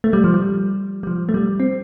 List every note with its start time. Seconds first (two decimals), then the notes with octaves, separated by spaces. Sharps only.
0.04 A3
0.13 G3
0.24 F3
0.34 G3
1.03 G3
1.07 F3
1.29 A3
1.34 G3
1.60 C4